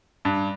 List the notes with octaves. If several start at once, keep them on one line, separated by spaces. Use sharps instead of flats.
G2